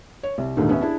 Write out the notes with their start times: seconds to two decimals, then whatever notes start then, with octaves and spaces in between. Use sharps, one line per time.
0.23 C#5
0.38 C2
0.57 A#1 D#2 G#2 D3 D#3 A3
0.69 B3 C#4 E5
0.81 D4 E4 G#4